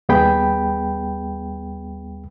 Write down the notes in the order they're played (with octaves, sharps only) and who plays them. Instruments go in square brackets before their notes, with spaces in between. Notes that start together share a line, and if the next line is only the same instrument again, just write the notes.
[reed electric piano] D#2 G3 B3 G#4 G5 B5